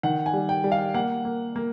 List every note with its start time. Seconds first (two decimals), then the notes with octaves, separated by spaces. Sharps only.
0.03 D#3 F#5
0.26 G#5
0.33 G3
0.49 G5
0.64 G3
0.72 F5
0.94 A#3 F#5
1.25 A#3
1.56 A#3